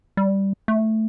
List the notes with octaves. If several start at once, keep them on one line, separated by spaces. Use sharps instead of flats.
G3
A3